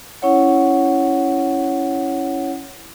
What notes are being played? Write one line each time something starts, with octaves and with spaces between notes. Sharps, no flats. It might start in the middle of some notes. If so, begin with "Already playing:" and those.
C#4 E4 C#5 F#5